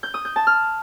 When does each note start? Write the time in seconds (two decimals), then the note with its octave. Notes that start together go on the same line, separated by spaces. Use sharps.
0.03 G6
0.14 D#6
0.25 G6
0.36 A5
0.47 F6